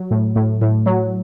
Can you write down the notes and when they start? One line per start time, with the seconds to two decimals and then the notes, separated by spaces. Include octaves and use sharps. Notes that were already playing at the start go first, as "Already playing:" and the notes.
Already playing: F#3
0.11 A2
0.36 A2
0.62 A2
0.86 F#3